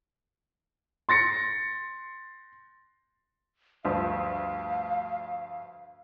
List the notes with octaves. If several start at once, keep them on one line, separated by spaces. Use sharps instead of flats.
C6 A6 A#6 C#7
D2 G2 F3 F5